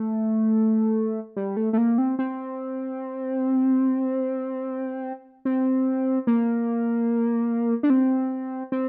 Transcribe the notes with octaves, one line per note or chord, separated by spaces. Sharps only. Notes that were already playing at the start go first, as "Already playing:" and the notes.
Already playing: A3
G3
A3
A3
A#3
C4
C4
C4
A#3
D4
C4
C4